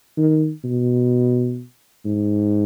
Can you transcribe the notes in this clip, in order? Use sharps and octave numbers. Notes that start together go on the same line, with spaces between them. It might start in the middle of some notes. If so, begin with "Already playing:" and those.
D#3
B2
G#2